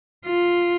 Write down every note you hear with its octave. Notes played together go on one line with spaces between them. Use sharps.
F4